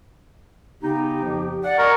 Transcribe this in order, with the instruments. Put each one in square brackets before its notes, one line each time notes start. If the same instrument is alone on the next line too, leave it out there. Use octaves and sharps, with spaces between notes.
[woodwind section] C#3 B3 D#4 [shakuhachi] G4
[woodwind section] F2 F3
[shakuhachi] D5 [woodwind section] F#5
[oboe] A#4 [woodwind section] D#5 G#5 C#6